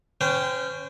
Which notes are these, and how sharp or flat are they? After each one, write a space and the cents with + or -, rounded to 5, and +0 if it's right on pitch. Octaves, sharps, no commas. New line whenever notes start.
C#4 +0 C5 -35 G5 +0